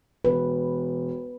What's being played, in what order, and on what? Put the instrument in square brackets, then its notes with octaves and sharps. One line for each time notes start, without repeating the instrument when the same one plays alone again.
[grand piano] E1 [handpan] B4